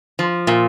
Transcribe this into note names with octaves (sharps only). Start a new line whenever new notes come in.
F3
A#2